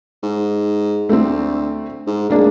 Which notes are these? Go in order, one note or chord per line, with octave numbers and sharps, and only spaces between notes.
G#2
D2 A3 C4
G#2
D1 G#3 A#3 D4